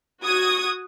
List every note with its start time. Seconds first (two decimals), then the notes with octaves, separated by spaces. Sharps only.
0.23 F#4 D#6 G#6